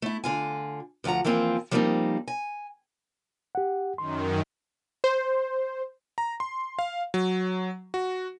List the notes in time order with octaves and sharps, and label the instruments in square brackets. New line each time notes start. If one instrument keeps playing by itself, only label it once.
[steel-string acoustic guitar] A3 E4
D3 F4 G#5
D2 F3 E5 F#5 A#5
E3 F3 A#3 C4 F4
F3 G3 A#3 C4 C#4 D#4
G#5
[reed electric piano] G4 F#5
[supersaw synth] F#2 D#3 [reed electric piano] C6
[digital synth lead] C5
[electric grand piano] A#5
C6
F5
F#3
F#4